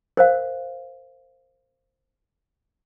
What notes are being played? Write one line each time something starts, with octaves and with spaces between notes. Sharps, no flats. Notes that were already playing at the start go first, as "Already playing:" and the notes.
A#4 C5 F5